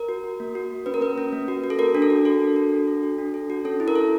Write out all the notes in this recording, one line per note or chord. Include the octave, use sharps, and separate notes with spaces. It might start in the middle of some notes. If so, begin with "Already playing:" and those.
Already playing: A#4
F#4
F#4
A#3
F#4
A#3
C#4 B4
A#4
C#4 B4
C#4
A#3
F#4
F#4
A4
F#4 A#4
D4
A4
F#4
F#4 A4
D4
F#4
D4
A4
F#4
D4
A4
F#4
C#4 A4
E4
A#4
A4